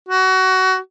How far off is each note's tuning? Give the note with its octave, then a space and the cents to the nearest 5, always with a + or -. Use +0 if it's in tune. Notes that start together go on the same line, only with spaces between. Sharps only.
F#4 +20